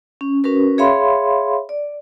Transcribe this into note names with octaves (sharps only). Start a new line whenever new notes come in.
C#4
C#4 F#4 A#4 B4
G#4 C#5 E5 F5 B5 C6
D5